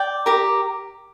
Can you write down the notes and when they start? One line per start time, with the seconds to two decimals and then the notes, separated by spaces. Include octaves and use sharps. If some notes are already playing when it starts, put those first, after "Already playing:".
Already playing: D5 G5
0.26 G4 A#4 A#5